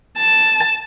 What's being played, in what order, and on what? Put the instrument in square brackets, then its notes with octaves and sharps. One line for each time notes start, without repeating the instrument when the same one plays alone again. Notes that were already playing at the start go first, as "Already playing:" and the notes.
[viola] A5